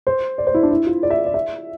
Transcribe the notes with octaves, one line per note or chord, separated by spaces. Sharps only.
C5
D5
C5
E4
D4
E4
F4
D5
E5
D5
E5